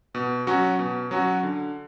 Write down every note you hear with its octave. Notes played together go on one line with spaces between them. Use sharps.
B2
F#3 C#4 F#4
B2
F#3 C#4 F#4
D3